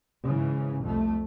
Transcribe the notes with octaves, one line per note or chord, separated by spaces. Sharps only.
G#2 C#3 E3
C2 F2 A3